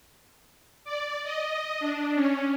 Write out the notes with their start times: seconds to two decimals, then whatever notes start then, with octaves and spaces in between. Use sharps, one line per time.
0.84 D5
1.24 D#5
1.80 D4
2.15 C#4